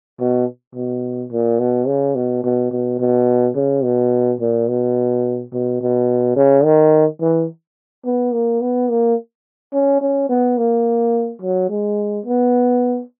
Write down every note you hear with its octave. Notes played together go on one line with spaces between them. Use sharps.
B2
B2
A#2
B2
C#3
B2
B2
B2
B2
C#3
B2
A#2
B2
B2
B2
C#3
D#3
E3
B3
A#3
B3
A#3
C#4
C#4
B3
A#3
F#3
G#3
B3